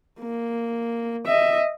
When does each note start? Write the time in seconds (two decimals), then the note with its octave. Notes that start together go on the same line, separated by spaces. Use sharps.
0.20 A#3
1.26 D#5 E5